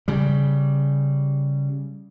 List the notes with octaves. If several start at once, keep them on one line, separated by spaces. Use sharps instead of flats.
C#3 G3